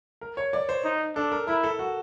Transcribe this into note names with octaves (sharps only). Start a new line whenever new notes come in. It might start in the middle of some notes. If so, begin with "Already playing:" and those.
A#4
C#5
D5
C5
D#4
D4 A4
A#4
E4 A#4
A4
F#4